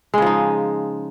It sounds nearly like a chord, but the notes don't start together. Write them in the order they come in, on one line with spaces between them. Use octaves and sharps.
G#3 C#3 F3 D#4